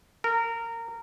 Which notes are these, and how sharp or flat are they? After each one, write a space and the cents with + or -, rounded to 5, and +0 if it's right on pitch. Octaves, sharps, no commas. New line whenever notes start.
A#4 -20